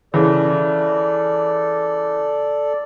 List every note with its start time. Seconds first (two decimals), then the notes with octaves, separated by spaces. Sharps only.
0.14 C#3 E3 A4 D5